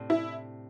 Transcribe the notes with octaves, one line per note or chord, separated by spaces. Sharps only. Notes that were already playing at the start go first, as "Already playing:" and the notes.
Already playing: A2 C3 C4 D4
E4